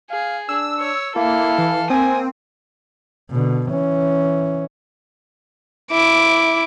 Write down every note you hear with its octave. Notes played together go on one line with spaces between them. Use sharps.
G#4 F5
D4 E6
C#5
A#3 E4 A4 F5
E3
A#3 C4 G#5 D#6
B2 D3
E3 C#4
E4 D6